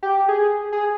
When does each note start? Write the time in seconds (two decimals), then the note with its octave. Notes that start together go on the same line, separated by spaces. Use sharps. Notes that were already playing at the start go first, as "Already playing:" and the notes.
0.03 G4
0.28 G#4
0.72 G#4